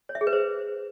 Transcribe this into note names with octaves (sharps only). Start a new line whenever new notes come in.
C#5
E5
G#4
B4
C5